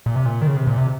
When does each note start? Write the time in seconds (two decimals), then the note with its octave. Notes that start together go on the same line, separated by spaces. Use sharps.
0.06 A#2
0.15 C3
0.26 A#2
0.42 D#3
0.47 C#3
0.57 C3
0.67 A#2
0.78 C3